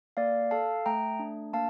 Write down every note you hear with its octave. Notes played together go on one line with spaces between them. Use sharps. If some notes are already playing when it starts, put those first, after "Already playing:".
A#3 D5 F5
A4 F5 A5
A3 G5 A#5
D4
A#3 F5 A5